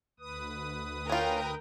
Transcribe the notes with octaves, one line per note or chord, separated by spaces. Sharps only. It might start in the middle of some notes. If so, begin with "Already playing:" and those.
D2 B4 D#6
C#4 F4 A#4 G5 A#5